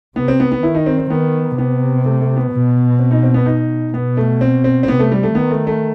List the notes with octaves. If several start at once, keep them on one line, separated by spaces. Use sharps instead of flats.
C3 B3
C4
B3
B3
D#3 E4
D#4
C4
C4
D#3 B3
C3 B3
A3
A3
B3
B2
C4
D#4
C4
B3
D#4
B2 B3
A3
C4
C4
C4
C3 B3
A3
G3
A3
D#3 B3
A3
A3